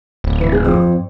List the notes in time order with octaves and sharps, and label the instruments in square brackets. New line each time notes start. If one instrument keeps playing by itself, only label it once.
[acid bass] D1
[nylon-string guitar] E3
G#4
F2